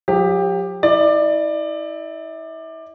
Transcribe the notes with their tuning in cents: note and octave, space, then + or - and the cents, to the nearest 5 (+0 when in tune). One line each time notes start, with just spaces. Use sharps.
F#3 -45 G4 +15
E4 -35 D5 +20